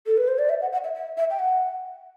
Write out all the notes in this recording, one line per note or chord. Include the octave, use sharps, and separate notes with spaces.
A4
B4
C5
D5
E5
F#5
F#5
E5
E5
E5
G5
F#5